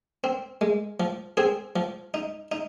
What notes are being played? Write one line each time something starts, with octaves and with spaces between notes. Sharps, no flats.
C4
G#3
F3
C4 G#4
F3
D#4
D#4